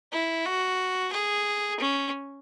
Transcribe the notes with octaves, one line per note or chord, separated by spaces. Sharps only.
E4
F#4
G#4
C#4